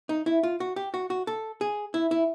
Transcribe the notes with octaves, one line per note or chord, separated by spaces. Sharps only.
D#4
E4
F4
F#4
G4
F#4
F#4
A4
G#4
E4
E4